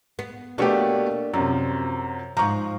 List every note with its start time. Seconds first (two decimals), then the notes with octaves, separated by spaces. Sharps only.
0.19 B3
0.58 B2 A3 A#3 D4 G4 C#5
1.34 F#2 C3 F3
2.37 G#2 F3 A#5 C#6